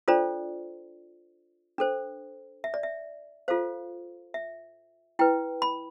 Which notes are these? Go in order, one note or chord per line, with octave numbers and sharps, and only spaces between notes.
D4 F4 A4 C5 D5
D4 A4 C5
E5
D5
E5
F4 A4 C5 F5
E5
E4 B4 G5
B5